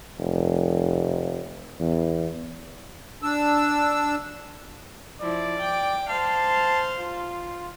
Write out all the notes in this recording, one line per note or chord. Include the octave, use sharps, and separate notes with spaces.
F1
E2
D4 E6
F3 E4 D5
G5 D6
C5 F5 A5
F4